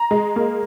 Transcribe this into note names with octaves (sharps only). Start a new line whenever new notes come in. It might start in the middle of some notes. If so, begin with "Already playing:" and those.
Already playing: A#5
G#3
A#3